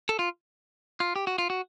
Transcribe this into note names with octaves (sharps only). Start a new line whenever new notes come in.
A4
F4
F4
G4
F#4
F4
F#4